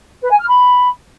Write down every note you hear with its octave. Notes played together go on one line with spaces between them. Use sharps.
B4
G#5
F6
B5